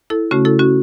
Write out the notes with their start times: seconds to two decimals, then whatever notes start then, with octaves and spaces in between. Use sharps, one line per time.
0.10 E4 A4
0.31 C#3 A3 C#4 F#4
0.45 E4 A4
0.59 C#4 F#4